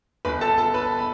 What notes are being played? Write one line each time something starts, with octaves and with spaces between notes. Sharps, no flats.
G1 B4 B5
A4 A5
G1
A4 A5
G1 B4 B5
B5